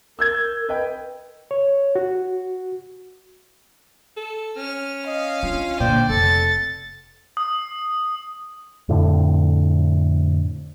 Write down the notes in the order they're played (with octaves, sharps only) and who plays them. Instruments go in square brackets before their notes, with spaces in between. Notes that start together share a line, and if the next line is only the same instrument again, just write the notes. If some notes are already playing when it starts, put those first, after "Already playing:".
[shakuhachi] A#4 [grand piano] E6 G6 G#6
[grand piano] B4 D#5 G5
[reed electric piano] C#5
F#4
[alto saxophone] A4
[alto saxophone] C#4 [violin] F6 F7
[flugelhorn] D#5 [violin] F5
[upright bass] D4 [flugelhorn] F4
[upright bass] A#2 D3 [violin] C5 [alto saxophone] D5 [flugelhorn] G5
[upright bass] F1 [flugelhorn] A4 [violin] A6 C#7
[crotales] D#6
[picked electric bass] F2 A2 D3